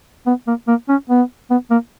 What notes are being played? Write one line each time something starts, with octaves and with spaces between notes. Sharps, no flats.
B3
A#3
A#3
C#4
B3
B3
A#3